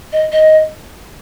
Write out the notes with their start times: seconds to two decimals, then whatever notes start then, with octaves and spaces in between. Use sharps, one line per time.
0.13 D#5
0.32 D#5